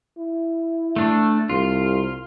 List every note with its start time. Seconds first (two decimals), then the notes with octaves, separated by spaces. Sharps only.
0.18 E4
0.96 A3 D4
1.49 C2 F4